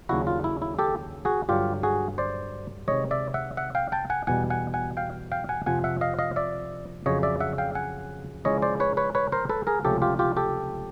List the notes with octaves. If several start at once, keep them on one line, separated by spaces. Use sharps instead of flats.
D#2 C#3 F#3 A#3 D4 E4 F#4
F4
E4
E4
G4 A4
F#4 G#4
G2 D3 F#3 F4 G4
F#4 G#4
C5 D5
C3 D#3 G#3 C#5 D#5
D5 E5
E5 F#5
E5 F#5
F5 G5
G5 A5
F#5 G#5
E2 B2 G3 F#5 G#5
F#5 G#5
F#5 G#5
F5 G5
F5 G5
F#5 G#5
F2 C3 F3 F#5 G#5
E5 F#5
D#5 F5
D#5 F5
D5 E5
F2 C#3 F#3 C#5 D#5
D5 E5
E5 F#5
F5 G5
F#5 G#5
C#3 F3 G#3 C#4 E4 C#5 D#5
C5 D5
B4 C#5
B4 C#5
B4 C#5
A#4 C5
A4 B4
G#4 A#4
C#2 C3 F3 A3 C#4 G4 A4
F4 G4
F4 G4
G4 A4